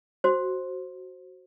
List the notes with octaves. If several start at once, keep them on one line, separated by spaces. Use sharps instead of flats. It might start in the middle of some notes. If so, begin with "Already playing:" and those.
F#4 C5